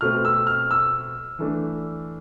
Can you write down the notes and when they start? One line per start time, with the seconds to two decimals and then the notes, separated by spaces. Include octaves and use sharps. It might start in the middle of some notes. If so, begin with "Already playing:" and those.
0.01 B2 A3 C4 F6
0.25 E6
0.47 F6
0.71 E6
1.39 E3 A3 D4